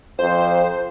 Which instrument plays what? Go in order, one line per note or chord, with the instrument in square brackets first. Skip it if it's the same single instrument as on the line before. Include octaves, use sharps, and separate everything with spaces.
[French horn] F2 [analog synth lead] C5